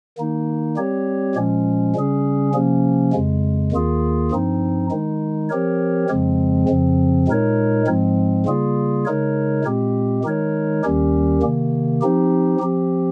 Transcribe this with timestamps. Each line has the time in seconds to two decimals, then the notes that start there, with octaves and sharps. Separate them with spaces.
0.18 D#3 A#3 D#4
0.76 G3 C4 G4 C#5
1.35 A#2 F3 G#3 C#4
1.95 C#3 G3 C#4 G#4
2.54 C3 F3 A#3 C#4
3.13 F2 C#3 G#3
3.72 D#2 D#3 A#3 F4 G#4
4.31 G2 F3 C4 D#4
4.90 D#3 G#3 D#4
5.49 F3 C4 G4 A#4 C#5
6.09 F2 C#3 F3 G#3 C4
6.68 F2 C#3 F3 C4
7.28 A#2 G#3 D#4 A#4 C#5
7.87 G#2 F3 G#3 C4
8.45 C#3 G3 A#3 F4 G#4
9.05 C#3 G#3 D#4 A#4 C#5
9.65 A#2 G#3 C4 G4
10.24 D#3 G#3 D#4 A#4 C#5
10.83 D#2 D#3 G3 C#4 G4
11.42 C3 D#3 A#3
12.01 F3 C4 D#4 G4
12.60 F3 C4 G4